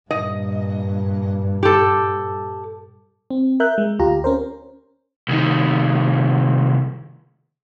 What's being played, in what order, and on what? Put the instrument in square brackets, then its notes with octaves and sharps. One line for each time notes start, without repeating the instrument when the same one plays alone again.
[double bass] G2 A#2 [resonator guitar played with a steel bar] D#5
[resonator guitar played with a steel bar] G4 A4
[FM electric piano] C4
A#4 E5 F#6 G6
G#3
D2 F4 G4 A#5
C#4 A#4 C5
[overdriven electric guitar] C2 D#3